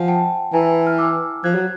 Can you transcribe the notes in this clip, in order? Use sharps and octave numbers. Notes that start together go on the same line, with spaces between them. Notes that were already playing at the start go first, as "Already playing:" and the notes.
Already playing: F3 F#5 G#5
G5 A5
E3 G#5 A#5
F6
D6 E6
F3 F#6 G#6
F#3